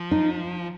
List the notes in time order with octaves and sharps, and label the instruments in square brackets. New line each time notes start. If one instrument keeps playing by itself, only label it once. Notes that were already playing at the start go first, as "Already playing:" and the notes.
Already playing: [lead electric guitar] F3
[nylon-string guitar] D#4